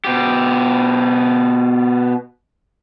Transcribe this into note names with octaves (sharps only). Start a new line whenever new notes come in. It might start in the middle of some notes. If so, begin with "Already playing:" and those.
B2 G4